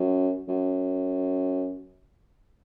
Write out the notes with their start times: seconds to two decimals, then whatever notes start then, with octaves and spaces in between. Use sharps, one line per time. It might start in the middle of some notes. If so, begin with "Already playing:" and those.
Already playing: F#2
0.48 F#2